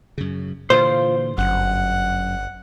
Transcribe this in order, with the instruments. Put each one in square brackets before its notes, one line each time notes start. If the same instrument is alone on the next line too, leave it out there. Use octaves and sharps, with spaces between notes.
[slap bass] F#2 C#3
[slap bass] A#2 D3 E3 [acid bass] F4 [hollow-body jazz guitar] C5
[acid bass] G1 [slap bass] F#2 [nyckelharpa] F#5